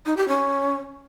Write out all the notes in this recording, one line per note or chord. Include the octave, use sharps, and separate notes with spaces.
D#4
G4
C#4